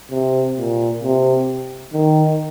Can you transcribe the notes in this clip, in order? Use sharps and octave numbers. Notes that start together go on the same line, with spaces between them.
C3
A#2
C3
D#3